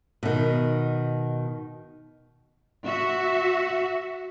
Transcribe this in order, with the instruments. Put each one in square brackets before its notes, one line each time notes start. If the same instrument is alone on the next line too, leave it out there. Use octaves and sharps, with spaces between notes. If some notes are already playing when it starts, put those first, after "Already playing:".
[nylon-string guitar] B2 D#3
[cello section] F#4 E5